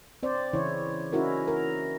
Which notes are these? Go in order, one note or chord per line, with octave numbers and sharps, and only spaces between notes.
C4 C5 D5
C#3 E3 E4 C#5
C#4 D#4 E4 F#4 A#4
A#4